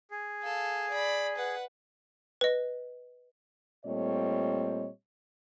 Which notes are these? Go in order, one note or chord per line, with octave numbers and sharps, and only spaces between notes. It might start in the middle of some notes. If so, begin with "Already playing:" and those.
G#4
A4 F5
D5 B5
B4 F#5
B4 D#5
A#2 G3 A3 C4 C#5 D#5